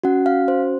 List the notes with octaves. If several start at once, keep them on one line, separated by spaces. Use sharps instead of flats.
C#4 F#4 F#5
F5
C5